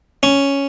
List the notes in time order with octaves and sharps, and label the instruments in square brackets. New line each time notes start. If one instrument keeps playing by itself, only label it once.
[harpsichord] C#4